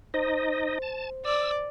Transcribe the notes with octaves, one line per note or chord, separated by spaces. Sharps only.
D#4 C5 D#5
A5
D5 E6